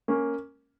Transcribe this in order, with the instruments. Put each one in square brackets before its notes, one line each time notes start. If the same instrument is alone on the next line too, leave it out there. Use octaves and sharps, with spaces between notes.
[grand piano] A#3 C#4